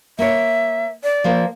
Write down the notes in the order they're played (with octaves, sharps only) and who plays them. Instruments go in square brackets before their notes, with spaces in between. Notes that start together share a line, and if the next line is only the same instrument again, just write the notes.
[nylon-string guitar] A#3 C#5 [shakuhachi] E5
[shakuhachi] D5
[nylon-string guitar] F3 A#3 C5